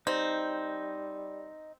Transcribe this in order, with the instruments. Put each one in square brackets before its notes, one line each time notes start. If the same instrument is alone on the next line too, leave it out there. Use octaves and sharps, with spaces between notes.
[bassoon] G3 [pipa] C4 [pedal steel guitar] D#4